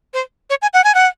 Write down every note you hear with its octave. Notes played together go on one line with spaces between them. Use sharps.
C5
C#5
G#5
F#5
G#5
F#5